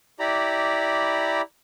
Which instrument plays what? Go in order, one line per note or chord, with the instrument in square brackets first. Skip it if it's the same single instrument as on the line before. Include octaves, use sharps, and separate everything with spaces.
[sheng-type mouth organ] E4 G4 D5 A#5 B5